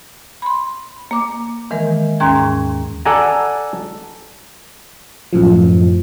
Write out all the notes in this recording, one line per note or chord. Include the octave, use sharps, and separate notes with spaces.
B5 C6
A#3 D6
D#3 E3 G#3 A#4
D#2 G#2 C#4 A#5 C6 G#6
A4 D5 F#5 G#5 A#5
F#2 A2 F3